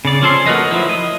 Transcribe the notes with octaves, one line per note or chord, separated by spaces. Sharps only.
C#3 D5
F3 C#4 A4 C6
A3 F#4 A#4 B4 D#5
F3 F#3 E4
D#5